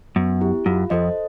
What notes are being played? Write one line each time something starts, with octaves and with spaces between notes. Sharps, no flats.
F#2 B3
E4 G4
F#2 F4
F2 A4 C5 D#5